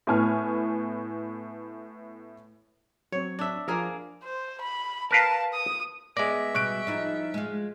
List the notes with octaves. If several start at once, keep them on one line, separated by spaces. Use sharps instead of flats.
A2 B3 G#5 F6
F#3 C4 C#5
D4 E5
F3 A#3 D4 G#4 A#4 C5
C5
B5
A#4 B4 F5 A5
D#6
G#3 B3 D5 E5 A#6
B2 G3 C#6 F#6 D7
F3 D#4 E4
G#3 F4